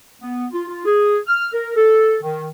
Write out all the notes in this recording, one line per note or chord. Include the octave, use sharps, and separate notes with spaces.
B3
F4
F4
G#4
F6
A#4
A4
D#3